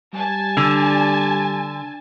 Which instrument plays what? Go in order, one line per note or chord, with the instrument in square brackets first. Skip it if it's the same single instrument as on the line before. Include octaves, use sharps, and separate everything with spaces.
[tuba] G3 [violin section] G#5 A5
[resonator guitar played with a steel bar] D3